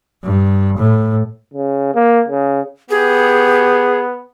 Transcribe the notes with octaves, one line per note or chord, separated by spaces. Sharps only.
G2
A2
C#3
A#3
C#3
B3 G4 G#4